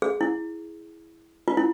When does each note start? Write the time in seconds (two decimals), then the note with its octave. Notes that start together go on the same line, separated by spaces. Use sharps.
0.02 G#4
0.21 E4
1.48 F4
1.57 E4